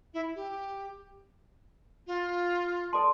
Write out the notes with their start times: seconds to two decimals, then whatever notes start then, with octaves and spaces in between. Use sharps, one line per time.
0.14 E4
0.36 G4
2.07 F4
2.93 A4 D5 A5 C6